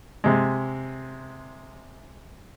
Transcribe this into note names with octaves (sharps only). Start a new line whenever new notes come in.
C3 G#3